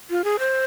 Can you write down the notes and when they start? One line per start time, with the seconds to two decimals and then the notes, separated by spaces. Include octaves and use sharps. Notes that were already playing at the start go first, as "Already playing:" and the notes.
0.10 F4
0.24 G#4
0.39 C5